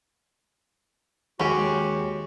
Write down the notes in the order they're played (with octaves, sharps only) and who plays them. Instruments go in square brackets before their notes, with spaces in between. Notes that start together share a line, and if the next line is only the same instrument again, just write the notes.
[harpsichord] D#2 [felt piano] G#3 [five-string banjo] C#4 G4 [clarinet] F#4